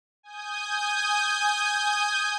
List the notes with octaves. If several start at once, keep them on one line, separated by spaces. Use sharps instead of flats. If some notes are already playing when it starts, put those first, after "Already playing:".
G#5 D#6 G6